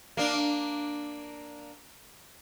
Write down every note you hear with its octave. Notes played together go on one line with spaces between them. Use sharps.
A#3 D4